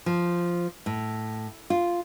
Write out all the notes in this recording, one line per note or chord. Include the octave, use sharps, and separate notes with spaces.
F3
A2
F4